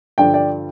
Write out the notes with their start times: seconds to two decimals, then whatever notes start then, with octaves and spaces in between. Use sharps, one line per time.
0.18 G2 D3 F3 D5 G5
0.34 D5 G5